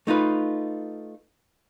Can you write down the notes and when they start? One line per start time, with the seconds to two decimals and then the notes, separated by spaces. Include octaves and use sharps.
0.07 A3 D#4 F4 B4